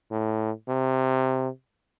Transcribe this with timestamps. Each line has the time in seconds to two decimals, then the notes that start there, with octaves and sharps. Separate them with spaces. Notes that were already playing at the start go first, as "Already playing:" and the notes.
0.11 A2
0.68 C3